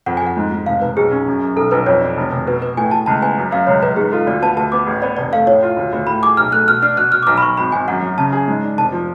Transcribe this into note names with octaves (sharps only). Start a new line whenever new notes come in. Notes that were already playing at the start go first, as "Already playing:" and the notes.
F2 F#5
F2 G#5
F#5
G#2
G#2
F1 F5
F1 B4
B1 G#4
C#4
F#2
F#2
B1 A4
B1 B4
F2 C#5
D4
F1
F1
B2 B4
B2 B4
A2 G#5
A2 A5
C#2 A5
B3 G#5
F#2
F#2 F5
C#2 C#5
C#2 B4
G#2 G#4
F4 A4
D2 D5
B3 A5
D2 A5
B3 D6
A1
B3 D5
F1 D5
A3 F5
A2 C#5
F4
D2
D2
A2 B5
G#4 D6
B1 F6
A3 F#6
B2 F6
D4 F6
B2 F#6
B2 F6
D6
B1 F6
B5
B1 C#6
G#1 B5
G#1 G#5
F#2 F#5
F#2
C#3 A5
G#4
G#2
D4
F1 A5
F3